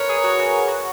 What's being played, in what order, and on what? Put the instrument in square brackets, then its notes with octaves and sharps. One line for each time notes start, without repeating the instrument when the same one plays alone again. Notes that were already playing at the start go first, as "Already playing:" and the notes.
Already playing: [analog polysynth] A#4 B4 [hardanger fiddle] C#5
[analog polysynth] G#4
F#4
F#4
F#4